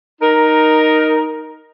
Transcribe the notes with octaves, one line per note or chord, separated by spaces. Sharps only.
D#4 A#4